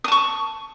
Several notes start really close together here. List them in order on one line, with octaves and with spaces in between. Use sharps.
D#6 A5 C#6